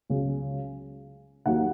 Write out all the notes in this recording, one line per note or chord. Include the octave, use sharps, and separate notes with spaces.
C#2 C#3 F#3
D#2 D#3 F#3 A#3 F#5